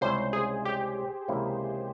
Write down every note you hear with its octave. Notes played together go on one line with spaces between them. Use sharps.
C#2 C3 G3 C#4 E4 C5
G#4
G4
C#2 C3 E3 A#3 E4